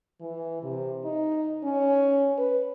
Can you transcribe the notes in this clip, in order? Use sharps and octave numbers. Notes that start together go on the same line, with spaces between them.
E3
C3
D#4
C#4
B4